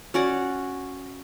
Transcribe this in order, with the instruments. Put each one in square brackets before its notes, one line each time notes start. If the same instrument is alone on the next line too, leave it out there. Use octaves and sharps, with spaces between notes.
[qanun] C#4 F#4 D5 F#5